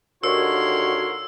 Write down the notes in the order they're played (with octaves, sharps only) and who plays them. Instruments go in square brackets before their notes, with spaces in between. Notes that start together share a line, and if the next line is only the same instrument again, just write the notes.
[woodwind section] D#2 D3 C#5 [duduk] F#4 [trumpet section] A#4 C6 [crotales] E6